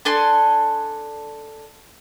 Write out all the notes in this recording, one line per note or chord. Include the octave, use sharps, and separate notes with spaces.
D4 A4 G#5 C6